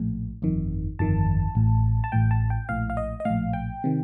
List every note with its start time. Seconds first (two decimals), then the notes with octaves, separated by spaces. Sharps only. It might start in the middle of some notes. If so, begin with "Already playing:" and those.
Already playing: A#1 A2
0.42 G1 F2 D#3
0.99 G1 F2 D#3 A5
1.55 A1 A2
2.04 A5
2.12 A1 A2 G5
2.31 A5
2.50 G5
2.69 A#1 A2 F5
2.90 F5
2.97 D#5
3.20 D#5
3.25 A#1 A2 F5
3.53 G5
3.84 C3 D#3